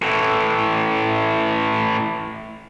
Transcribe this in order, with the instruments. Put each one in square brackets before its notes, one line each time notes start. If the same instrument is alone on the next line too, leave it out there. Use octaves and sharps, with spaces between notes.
[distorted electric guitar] A2 E3